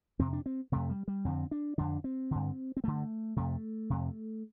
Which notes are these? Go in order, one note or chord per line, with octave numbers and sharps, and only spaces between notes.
F2 C3 C4
D4
C4
F2 C3 A3
G3
G3
F2 D3 C4
D4
F2 D3 D4
C4
G2 D3
C4
G2 D3 A3
F2 C3 A3
F2 C3